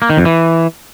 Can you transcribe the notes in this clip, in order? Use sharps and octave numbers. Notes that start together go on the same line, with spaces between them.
A#3
D#3
F2
E3